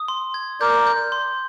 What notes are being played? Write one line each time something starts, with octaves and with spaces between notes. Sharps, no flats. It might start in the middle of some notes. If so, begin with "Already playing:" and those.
Already playing: D#6
C6
G#6
A#4 D5 G6
G6
C6